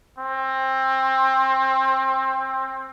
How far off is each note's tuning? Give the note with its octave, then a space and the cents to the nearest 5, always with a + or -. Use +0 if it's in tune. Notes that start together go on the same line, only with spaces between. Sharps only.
C4 +20